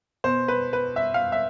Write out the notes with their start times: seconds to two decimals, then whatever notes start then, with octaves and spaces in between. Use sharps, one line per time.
0.24 B2 C5
0.48 B4
0.73 B4
0.96 E5
1.14 F5
1.32 E5